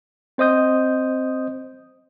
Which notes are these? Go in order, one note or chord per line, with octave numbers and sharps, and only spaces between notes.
C4 C5 D#5 D#6 G6